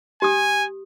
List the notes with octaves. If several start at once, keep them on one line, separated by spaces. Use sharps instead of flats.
G4 G#5 D#6